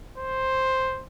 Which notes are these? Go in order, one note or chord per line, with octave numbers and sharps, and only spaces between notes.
C5